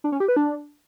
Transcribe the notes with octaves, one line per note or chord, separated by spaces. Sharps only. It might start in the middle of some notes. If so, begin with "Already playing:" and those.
D4
C#4
G4
B4
D4